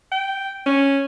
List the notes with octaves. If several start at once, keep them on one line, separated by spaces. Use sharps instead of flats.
G5
C#4